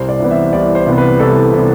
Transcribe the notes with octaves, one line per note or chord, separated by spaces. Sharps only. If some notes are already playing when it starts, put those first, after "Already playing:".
Already playing: C2 C5
D5
C3 E3 B3
E5
C2 D5
C5
C3 E3 B3
B4
C2 A4
C3 E3 B3